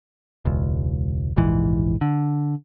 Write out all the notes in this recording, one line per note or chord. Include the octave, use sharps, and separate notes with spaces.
E1 C#2
F1 A#1 G#2 E3
D3